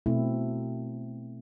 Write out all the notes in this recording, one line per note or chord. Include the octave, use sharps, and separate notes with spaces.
B2 A3 C4 E4